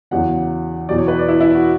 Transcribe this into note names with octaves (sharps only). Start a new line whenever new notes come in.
E2 C#3 F#3 F#5
E2 B2 F#3 D5
C#5
B4
D5
E4
E4
F#4